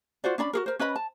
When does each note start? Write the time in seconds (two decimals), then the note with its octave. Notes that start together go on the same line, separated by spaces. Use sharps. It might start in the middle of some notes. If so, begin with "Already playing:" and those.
0.24 F4 F#4 C5 D5
0.38 C#4 D4 D5 B5
0.53 F#4 G#4 A#4
0.66 A#4 C5
0.79 C#4 B4 D#5 B5
0.96 A5